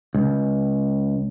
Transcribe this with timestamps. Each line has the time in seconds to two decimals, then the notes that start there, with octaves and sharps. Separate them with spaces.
0.15 C#2